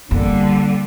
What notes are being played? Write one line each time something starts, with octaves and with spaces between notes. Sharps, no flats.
D3 G3 A#3 C4